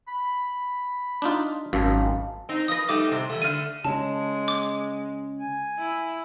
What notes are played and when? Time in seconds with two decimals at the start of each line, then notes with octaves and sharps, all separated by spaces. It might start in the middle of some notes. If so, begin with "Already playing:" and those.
0.08 B5
1.22 D4 D#4 F4
1.73 G#1 F#2 F5 A5
2.49 C4 D#4
2.68 F3 B4 D#6 A#6
2.89 G3 A3 D#4 D6
3.11 A2 C3 C4
3.29 E3 G3 A3
3.42 D3 A3 F6 D#7
3.84 C#3 G#3 A5
4.48 D6
5.39 G#5
5.78 E4